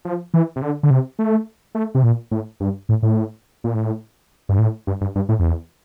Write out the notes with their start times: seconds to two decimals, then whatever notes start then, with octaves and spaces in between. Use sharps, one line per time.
0.05 F3
0.34 E3
0.56 C3
0.62 D3
0.83 D3
0.90 C3
1.19 A3
1.75 A3
1.95 C3
2.03 A#2
2.31 A2
2.60 G2
2.89 A2
3.03 A2
3.64 A#2
3.74 A2
4.49 G2
4.59 A2
4.87 G2
5.01 G2
5.15 G2
5.29 A2
5.39 F2
5.44 E2